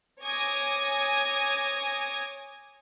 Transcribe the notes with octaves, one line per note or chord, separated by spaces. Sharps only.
C#5 G#5 D6 D#6 G#6 A#6